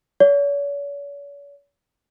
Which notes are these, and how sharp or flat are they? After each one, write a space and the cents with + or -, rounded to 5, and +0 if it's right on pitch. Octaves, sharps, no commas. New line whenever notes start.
C#5 +45